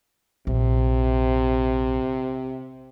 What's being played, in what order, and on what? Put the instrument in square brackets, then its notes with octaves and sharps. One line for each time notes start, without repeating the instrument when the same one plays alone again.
[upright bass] A#1 [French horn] C3